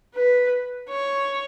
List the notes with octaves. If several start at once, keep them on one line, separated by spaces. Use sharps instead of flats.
B4
C#5